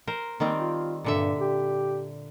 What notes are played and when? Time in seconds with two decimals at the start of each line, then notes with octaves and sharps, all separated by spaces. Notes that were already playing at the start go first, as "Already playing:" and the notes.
0.07 A#4 C5
0.40 D#3 G3 A#3 C4
0.58 F4
1.04 G2 A#2 D3 E5
1.40 G4